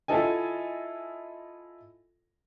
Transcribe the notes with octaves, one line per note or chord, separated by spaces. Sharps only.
E4 F4 A4 D#5 G#5